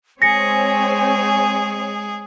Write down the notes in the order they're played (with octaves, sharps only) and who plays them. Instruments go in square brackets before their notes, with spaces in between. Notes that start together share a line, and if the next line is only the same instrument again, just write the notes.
[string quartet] G#3 G#4 [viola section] C4 C#5 [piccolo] G#5 [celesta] A#6 C#7